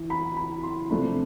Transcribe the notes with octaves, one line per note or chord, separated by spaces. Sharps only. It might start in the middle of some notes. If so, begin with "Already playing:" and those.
Already playing: E3
B5
B5
C6
C3 F3 A3 D4 B5